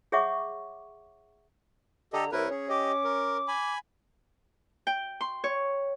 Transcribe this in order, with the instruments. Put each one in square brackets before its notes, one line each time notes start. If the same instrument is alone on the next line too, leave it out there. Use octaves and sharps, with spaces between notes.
[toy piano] G#4 C#5 E5 F#5 C#6 D6
[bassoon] D3 [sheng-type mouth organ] G4 A4 D#5 [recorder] A#5
[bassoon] C2 [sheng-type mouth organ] E4 A#4 B4 [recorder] C#5
[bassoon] C#4 [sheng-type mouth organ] G#4
[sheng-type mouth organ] G4 D#5 [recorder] D6
[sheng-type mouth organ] A#4
G#5 B5
[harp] G5
C6
C#5